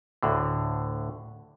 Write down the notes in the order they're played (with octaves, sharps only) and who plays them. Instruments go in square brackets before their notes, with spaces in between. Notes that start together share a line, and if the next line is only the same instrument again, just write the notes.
[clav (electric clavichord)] D2 A2 D3